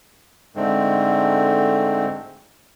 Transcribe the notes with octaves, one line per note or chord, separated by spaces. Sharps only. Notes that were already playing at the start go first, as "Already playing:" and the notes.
G#2 D3 G#3 A3 C4